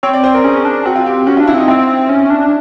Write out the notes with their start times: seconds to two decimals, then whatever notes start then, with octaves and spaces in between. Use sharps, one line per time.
0.03 C4 C#5
0.13 D5
0.24 C5
0.34 A#4
0.44 C#4 G#4
0.65 D4
0.86 C4 F#4
0.96 F4
1.06 G4
1.27 C#4 F#4
1.37 F4
1.40 D4
1.47 E4
1.54 C4 D#4
1.68 C4 E4
2.09 C#4
2.30 D4